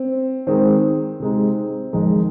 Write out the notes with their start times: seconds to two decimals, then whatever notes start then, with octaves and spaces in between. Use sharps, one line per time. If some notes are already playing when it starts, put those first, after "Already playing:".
Already playing: C4
0.47 D#3 G#3 C4 D#4
1.20 C3 G#3 D#4
1.93 F2 D#3 G#3 D#4